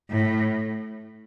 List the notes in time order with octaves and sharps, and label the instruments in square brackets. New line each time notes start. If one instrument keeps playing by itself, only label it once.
[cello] A2